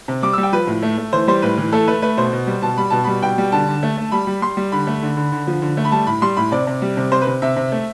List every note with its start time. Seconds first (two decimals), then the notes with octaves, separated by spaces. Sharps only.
0.08 C3
0.22 G3 D6
0.33 G3 E6
0.43 G5
0.53 F3 B4
0.67 A2
0.82 A3
0.98 A3
1.13 E3 C5
1.28 G3 C5
1.42 A2 B4
1.58 E3
1.72 A3 A4
1.87 A3 B4
2.02 A3 B4
2.17 B2 C5
2.33 B2
2.47 G3
2.62 B2 A5
2.78 G3 B5
2.90 B2 A5
3.04 G3 B5
3.22 B2 G5
3.38 G3
3.52 D3 A5
3.68 D3
3.83 A3
3.97 A3
4.12 G3 B5
4.27 G3
4.42 G3 C6
4.57 G3
4.72 D3 B5
4.87 A3
5.03 D3
5.17 D3
5.32 D3
5.47 F3
5.62 D3
5.77 A3
5.85 B5
5.92 G3 A5
6.07 A2 B5
6.22 G3 C6
6.37 A2 B5
6.52 C3 D5
6.67 C3
6.82 G3
6.97 C3
7.12 C3 C5
7.22 B4
7.27 C3
7.42 C3 E5
7.56 C3
7.72 A3